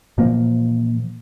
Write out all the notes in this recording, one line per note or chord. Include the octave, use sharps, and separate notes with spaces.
A#2 E3 F3 A#3